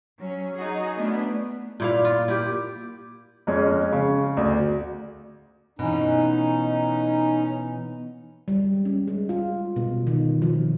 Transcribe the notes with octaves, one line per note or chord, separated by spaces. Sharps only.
F#3 C#4
D#4 F#4 G#4
A3 B3 C#4 D4 E4
A#2 E4 F5
F4
E4 G4
F2 G#3 C#4
C#3
D2
B2 E3 C#4 D#4
G3
G#3
C#4
G#3
F4
B2
D#3
F3